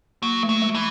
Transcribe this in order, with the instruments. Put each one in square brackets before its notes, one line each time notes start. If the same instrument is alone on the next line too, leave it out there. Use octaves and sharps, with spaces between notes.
[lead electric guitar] F#3 [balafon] A#3
[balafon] A3
[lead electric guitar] F#3
[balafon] G#3
[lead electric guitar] E3